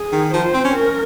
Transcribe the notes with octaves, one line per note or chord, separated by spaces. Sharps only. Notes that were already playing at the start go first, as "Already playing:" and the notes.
Already playing: G#4
D#3
F3 C5
C4
C#4
A#4